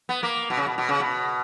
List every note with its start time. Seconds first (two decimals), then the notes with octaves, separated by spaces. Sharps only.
0.09 B3
0.23 A#3
0.50 B2
0.57 C#3
0.66 B2
0.78 B2
0.89 C#3
1.00 B2